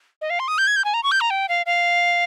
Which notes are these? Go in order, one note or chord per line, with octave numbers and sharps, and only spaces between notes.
D#5
F5
C6
D#6
G6
G#6
G6
G#5
A#5
C#6
G6
A#5
G5
F5
F5